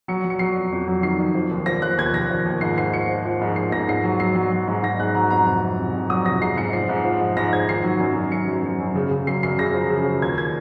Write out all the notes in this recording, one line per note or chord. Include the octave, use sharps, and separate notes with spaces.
F#3 C#7
F#3
C#7
F#3 C7
F2
F2
F#3
D#3 C7
F2
F3
D#2
F3 A#6
F3 F#6
D#2 G#6
D#2 A#6
F3
D#2
G#2 C7
G#2 C7
F3 C#7
F3
F3
G#2
G#2 C7
G#2 A#6
G#2 C7
F#3
F#3 C7
F#3
F#3
G#2
G#2 A#6
G#2 F#6
F#3 A#5
F2 A#5
C3 A#5
C3
C3
F2
F#3 D#6
C3 A#6
G#2 C7
G#2 C#7
F3 C7
G#2
F3
G#2
G#2 A#6
G#2 G#6
D#3 C7
F#3
F#2
F#2
F#2 C#7
F#2
F#2
F#2
C#3
C#3
F#2 C7
F#2 C7
C#3 A#6
F3
C#3
F3
D#2 G#6
G#6